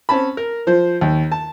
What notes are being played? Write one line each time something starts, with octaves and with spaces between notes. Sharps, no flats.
C4 C#4 A5 B5
A#4
F3 C5
D#2
A5